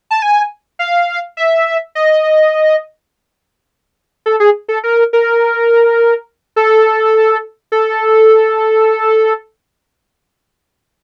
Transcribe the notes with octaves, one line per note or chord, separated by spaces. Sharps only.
A5
G#5
F5
E5
D#5
A4
G#4
A4
A#4
A#4
A4
A4